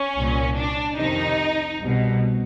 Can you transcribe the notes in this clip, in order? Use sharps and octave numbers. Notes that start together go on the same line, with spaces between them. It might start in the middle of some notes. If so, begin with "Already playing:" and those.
Already playing: C#4
C2 A#2
D4
F2 C3 D#3 D#4
C2 B2